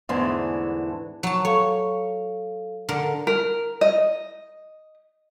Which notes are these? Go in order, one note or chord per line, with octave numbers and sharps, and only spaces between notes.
E2 G#2 D3 E3 A3 D4
F#3 A5
A4 C#5 F5
D3 A#4
A#4
D#5